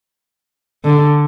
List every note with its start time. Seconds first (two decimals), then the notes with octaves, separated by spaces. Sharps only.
0.84 D3